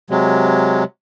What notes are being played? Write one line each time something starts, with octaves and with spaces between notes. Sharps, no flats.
C3 F#3 G#3